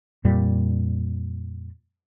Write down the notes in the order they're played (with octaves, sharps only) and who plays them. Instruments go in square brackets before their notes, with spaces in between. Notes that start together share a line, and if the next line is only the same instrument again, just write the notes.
[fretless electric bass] F2 A#2 G3